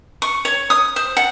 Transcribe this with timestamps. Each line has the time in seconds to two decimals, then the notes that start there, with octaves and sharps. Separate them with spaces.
0.22 C#6
0.45 C#5
0.70 D#6
0.96 C5
1.17 F#5